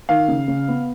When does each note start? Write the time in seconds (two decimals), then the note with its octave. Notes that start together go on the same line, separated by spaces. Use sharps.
0.09 D#3 F5
0.28 C#3
0.48 C#3
0.68 B3